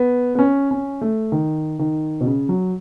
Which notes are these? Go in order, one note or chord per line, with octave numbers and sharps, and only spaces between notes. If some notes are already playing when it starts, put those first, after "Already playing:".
Already playing: B3
B3
C#4
C#4
A3
D#3
D#3
B2
C#3
F#3